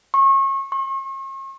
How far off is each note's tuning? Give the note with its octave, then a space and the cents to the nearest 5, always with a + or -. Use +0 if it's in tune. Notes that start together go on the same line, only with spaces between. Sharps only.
C#6 -35
C#6 -45